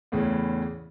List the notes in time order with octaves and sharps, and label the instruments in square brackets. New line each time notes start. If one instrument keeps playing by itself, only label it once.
[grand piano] E2 A2 C#3 E3